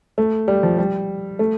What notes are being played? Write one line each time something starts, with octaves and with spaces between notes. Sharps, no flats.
A3
G3
F3
G3
A3